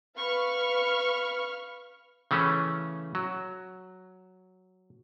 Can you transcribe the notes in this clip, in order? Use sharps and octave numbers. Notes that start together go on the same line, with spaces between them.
B4 F5 B5 C#6 F6
C#3 E3 A3 C#4
F#3